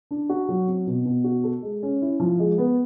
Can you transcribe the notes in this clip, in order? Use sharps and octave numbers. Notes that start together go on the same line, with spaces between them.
D4
F#4
F#3
C4
B2
B2
F#4
A4
G#3
C#4
E4
F3
G#3
B3